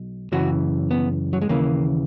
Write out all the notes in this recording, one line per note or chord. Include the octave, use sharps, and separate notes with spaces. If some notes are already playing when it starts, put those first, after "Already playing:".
Already playing: B1
F#2 C#3 E3 F#4
B3
F#3
G#3
D#2 C#3 E3 A#3